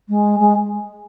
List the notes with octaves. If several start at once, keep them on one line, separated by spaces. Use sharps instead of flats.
G#3
G#3